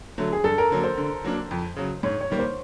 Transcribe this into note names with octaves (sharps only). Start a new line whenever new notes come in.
D3 F#3 A3
G#4
G2 A4
A#4
D3 F#3 A#3
C5
D3
F#3 A#3 D4
F2
C#3 F#3
G#2 C#5
C#5
D#3 G3 A#3
C5